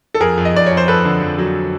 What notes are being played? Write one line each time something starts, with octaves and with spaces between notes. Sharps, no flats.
A4
F2 G#4 A#4
F2
D#5
F2 D5
F2 C#5
C5
F2 A4 B4
D3
F2
F#3